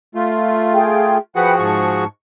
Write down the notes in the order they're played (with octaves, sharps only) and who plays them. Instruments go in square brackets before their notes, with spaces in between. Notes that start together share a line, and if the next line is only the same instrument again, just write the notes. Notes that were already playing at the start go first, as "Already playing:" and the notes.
[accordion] A3 F4
[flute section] G#4 G5
[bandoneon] F3 F#4 G#4 [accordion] B4 F#5 [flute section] G5
[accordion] G#2 C#6 [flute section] A5